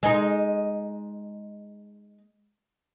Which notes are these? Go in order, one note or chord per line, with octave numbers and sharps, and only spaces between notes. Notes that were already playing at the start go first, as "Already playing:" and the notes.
G#3 D#4